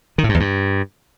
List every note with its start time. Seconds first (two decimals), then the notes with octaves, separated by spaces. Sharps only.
0.18 D#3
0.24 A2
0.29 G2
0.34 E2
0.40 G2